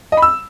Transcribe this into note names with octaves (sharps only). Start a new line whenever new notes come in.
D#5
B5
E6